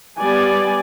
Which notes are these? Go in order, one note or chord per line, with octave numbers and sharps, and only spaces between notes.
G3 B3 D5 G#5